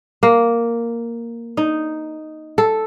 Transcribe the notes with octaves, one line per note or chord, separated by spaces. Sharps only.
A#3
D#4
A4